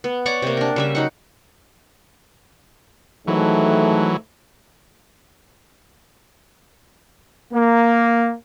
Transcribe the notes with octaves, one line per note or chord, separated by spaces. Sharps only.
B3
C#5 D5 F#5 D6
C3 A#3
D4 A#4
C#3 G3 E5
F#3 D#4 F#5
G#2 D#3 E3 F#3 A3
A#3